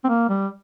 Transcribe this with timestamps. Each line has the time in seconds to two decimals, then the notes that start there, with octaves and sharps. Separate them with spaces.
0.04 C4
0.09 A#3
0.29 G3